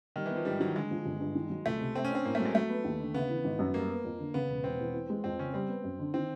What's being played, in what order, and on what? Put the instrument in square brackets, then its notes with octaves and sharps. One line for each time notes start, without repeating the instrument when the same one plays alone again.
[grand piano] D#3 [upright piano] G3
[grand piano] E3 [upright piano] B3
[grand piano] F3
[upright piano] G#2 [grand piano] G3
[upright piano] D#3 [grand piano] F#3
[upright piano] D3 [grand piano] G#3
[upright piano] F3
G1
G2
D#3
F#3
[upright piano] C#2 [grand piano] A3
[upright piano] C3
[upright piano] A3 [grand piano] C4
[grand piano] C#4
[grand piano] C4 [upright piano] D4
[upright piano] A2 [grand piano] A#3
[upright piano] F#3 [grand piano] A3
[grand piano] G#3
[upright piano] F#3 [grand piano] A3
[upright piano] B3
D#2
D3
[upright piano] C#3 [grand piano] B3
[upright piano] E3
G#1
F#2
[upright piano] G3 [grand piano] A#3
[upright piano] B3
F2
D3
[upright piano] C#3 [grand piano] B3
[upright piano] E1
[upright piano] E1 [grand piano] C4
[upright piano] E2
E3
G#3
[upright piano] F2 [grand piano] C4
[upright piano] C#3 [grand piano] C#4
[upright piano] G3 [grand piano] C4
[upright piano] B3
F#2
D3
[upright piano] D#3 [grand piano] C4